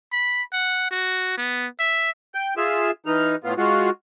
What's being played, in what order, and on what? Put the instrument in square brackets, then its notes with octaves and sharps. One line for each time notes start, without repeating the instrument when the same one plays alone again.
[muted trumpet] B5
F#5
F#4
B3
E5
[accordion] G5
F4 G#4 E5 E6
E3 D#4 F6
A2 B3 F4
G#3 F4 F#4